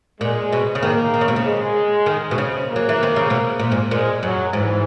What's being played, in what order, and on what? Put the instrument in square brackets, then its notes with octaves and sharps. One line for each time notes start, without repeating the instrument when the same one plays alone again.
[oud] A#2 [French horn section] G#3
[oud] B2
C#3
[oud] D#3 [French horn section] A#3
[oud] D#3
C#3
B2
C#3
[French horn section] G#3
[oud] D#3
B2
C#3
[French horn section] A#3
[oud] F#3
E3
D#3
C#3
B2
A#2
G#2
[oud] A#2 [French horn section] G#3
[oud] F#2 [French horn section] F#3
[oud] G#2 [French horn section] E3